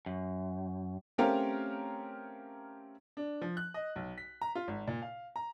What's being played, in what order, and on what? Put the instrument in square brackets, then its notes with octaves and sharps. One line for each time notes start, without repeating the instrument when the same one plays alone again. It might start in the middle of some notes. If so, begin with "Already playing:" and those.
[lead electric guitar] F#2
[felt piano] A3 C4 C#4 G4 A#4 F5
[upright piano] D4
F3
F#6
D#5
B1
B6
A#5
F4
G#1
A#2
F5
A#5